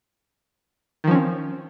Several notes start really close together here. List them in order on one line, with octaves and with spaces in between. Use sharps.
D#3 F3 C#4 C4